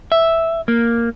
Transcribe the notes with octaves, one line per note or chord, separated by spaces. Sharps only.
E5
A#3